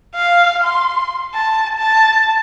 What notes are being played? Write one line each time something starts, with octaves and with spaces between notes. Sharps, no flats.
F5
C6
A5
A5